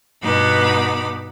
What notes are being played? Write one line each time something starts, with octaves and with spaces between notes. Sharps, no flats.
G2 B2 B3 D#4 B5 D6